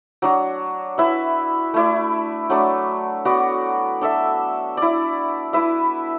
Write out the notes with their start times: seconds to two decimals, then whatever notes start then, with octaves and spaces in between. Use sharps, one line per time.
0.22 F#3 D4 F#4
0.98 E4 B4 E5
1.74 A3 E4 D5
2.50 F#3 A3 D4
3.25 B3 F#4 D5
4.01 D4 A4 E5
4.77 E4 D5
5.53 E4 B4 E5